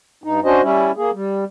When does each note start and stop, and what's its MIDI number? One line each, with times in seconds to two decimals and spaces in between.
0.24 0.40 43
0.24 0.40 63
0.45 0.62 61
0.45 0.62 62
0.45 0.62 66
0.45 0.62 72
0.45 0.62 75
0.62 0.91 55
0.62 0.91 61
0.62 0.91 64
0.97 1.11 58
0.97 1.11 68
1.13 1.44 55